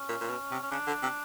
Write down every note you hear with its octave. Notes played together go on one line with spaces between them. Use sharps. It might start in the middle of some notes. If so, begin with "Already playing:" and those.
Already playing: C#4
A#2
A#2
B2
C3
C#4
C#3 D4
D3
C3